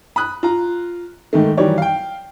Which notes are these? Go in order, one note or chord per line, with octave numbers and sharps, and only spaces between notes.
B5 D#6 F#6
F4 A#5
G#2 D#3 A3
D#3 E3 F#3 G3 C#5 D5
F5 G5